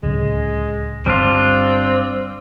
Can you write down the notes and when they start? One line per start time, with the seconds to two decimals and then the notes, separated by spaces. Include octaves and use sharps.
0.03 D1 C#2 C#3 G#3
1.06 G1 G3 C4 D4 F4